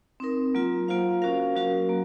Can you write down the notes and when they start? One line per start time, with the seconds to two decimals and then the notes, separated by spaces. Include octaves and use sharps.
0.20 C4 D#4 A#4
0.55 F#3 A#3 F4
0.88 A#3 F4 C5 F5
1.22 C#4 F#4 A#4 F5
1.56 F#3 C#4 F#4 A#4
1.89 A#3